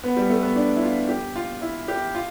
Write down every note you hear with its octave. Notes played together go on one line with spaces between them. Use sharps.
B3
G3
A3
B3
D4
E4
F4
G4
F4
E4
G4
F4